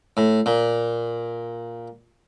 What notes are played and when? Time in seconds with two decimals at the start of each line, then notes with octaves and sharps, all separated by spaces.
0.17 A2
0.46 A#2